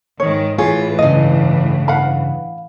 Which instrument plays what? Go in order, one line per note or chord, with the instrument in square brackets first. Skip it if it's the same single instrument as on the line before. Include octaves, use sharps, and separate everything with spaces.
[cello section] G#2 D#3 [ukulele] C#5
[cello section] A2 E3 [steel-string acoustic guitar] F4 [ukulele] G#4 C#5
[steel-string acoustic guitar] G2 C#3 [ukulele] D#5
[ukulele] F5 F#5 B5